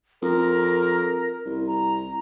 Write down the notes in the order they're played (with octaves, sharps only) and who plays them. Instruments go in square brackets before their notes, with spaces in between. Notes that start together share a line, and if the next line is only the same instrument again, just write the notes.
[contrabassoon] F2 [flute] A#4
[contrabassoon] C2
[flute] A#5